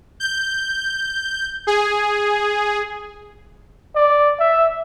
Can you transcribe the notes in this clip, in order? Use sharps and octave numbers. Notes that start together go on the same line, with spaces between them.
G6
G#4
D5
E5